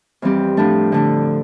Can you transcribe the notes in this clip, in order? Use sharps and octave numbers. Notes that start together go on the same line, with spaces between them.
F2 E3 G3 C4 G4
A2 F3 A3 D4
D3 A3 D4